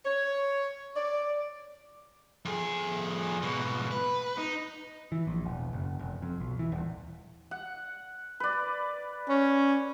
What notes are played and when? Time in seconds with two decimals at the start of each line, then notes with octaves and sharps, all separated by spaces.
0.05 C#5
0.96 D5
2.45 F2 G#4
3.43 G#2 B2
3.91 B4
4.38 D#4
5.12 E3
5.27 A#1
5.45 E1
5.73 F#1
5.99 F1
6.22 F2
6.41 B1
6.59 E3
6.72 D#1
7.51 F#5
8.40 B4 D5
9.29 C#4